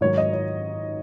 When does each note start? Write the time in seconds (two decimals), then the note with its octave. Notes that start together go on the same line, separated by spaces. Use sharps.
0.01 G#2 D#3 F#3 C#5
0.17 D#5
0.33 C#5